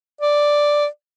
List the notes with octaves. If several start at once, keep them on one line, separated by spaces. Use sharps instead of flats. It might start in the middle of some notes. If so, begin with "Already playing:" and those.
D5